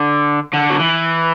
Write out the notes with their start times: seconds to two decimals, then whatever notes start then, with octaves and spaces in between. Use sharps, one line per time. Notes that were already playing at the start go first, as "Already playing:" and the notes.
Already playing: D3
0.53 D3
0.70 F#3
0.79 E3